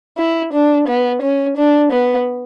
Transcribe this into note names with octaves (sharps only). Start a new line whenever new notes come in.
E4
D4
B3
C#4
D4
B3